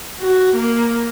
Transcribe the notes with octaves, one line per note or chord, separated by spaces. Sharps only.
F#4
A#3